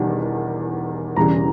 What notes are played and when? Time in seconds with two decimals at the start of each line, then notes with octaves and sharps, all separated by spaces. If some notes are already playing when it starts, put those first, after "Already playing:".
Already playing: E1 E2 D#3 G3
1.16 E1 E2 C#3 E3 G3 A#5